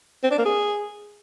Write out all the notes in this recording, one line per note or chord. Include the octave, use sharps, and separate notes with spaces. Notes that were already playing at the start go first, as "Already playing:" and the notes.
C4
D4
A#3
G#4